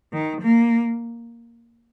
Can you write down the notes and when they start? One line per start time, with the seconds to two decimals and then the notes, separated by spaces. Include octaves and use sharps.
0.13 D#3
0.41 A#3